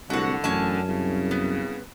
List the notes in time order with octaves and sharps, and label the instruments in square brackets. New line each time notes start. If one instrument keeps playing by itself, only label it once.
[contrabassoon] D1 [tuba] C2 [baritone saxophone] D3 [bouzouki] F#4 F#5
[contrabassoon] A1 [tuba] F#2 [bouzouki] C#4 G#5 A5
[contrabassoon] C2 [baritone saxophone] C#3
[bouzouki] B3